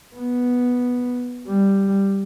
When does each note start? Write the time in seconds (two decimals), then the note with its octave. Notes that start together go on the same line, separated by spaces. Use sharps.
0.15 B3
1.48 G3